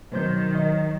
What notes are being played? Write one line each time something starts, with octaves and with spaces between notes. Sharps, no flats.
B2 D#3 F#3 C5 G6
D#5